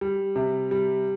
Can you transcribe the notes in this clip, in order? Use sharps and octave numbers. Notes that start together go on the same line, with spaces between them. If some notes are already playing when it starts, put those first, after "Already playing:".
G3
C3
G3